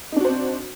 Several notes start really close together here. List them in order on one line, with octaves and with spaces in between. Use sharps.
D#4 D4 F#4 C5 C4